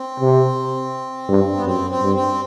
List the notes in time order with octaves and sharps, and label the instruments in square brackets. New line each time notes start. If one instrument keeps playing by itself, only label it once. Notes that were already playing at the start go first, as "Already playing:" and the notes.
Already playing: [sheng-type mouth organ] C4
[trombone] C3
G2
[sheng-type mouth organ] B3
[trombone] F#2 [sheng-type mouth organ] C4
[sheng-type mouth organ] C4
[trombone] G2
[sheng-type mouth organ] C4